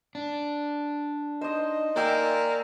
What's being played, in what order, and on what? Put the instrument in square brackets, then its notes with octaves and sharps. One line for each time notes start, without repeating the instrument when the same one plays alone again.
[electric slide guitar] D4
[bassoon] D#4 [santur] C5 D#5
[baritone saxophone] A#3 [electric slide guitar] D5 [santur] E5 G5 G#5